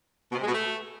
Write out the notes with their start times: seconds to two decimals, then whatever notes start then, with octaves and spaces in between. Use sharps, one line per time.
0.31 B2
0.36 C3
0.42 G#3
0.47 B2
0.52 A3